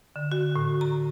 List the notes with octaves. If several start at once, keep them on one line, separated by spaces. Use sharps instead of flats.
D3
F#4
A2
A#5